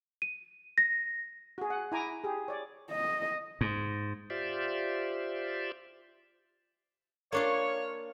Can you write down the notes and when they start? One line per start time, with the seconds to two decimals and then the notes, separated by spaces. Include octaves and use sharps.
0.22 D#7
0.78 A#6
1.58 F#4 G#4
1.70 F#5
1.92 E4 G#5 A#5 D6
2.24 G4 G#4
2.48 C#5 D5
2.91 D#5
3.61 G#2
4.30 F4 G4 C5 D5 E5
7.32 A#3 D4 F4 C#5